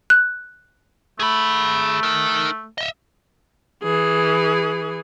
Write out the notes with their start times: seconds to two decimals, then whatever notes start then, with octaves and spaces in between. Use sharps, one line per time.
0.10 F#6
1.20 A3 G#4 B5
2.03 D#4 A#4
2.78 D#5 E5
3.83 E3 G#4